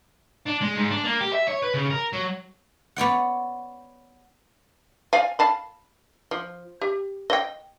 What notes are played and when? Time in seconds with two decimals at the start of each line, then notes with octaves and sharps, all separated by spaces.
0.46 D4
0.61 G#3
0.76 G#2
0.90 D4
1.04 A#3
1.21 G4
1.33 E5
1.48 C#5
1.62 B4
1.74 C#3
1.90 A#4
2.13 F#3
2.96 B3 C#5 D5 F#5
5.13 D5 F5 G#5
5.39 F5 A5 B5
6.31 F3
6.81 G4
7.30 D#5 G5